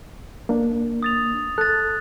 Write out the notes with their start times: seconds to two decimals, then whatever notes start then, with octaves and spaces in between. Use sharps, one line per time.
0.49 A#3 D4
1.03 D#6 A6 F7
1.58 A4 F#6 A6